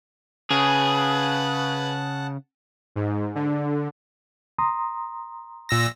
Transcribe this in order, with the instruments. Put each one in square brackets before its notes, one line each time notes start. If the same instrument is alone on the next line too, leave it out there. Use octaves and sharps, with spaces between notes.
[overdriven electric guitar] C#3 [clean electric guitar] G#4 [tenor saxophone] B4 [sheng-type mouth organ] F#5 A5
[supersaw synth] G#2
D3
[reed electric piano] A#5 C6 D#6
[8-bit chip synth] A#2 E6 A#6